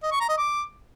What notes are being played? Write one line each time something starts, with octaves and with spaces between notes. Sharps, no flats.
D#5
C#6
A#5
D#5
D6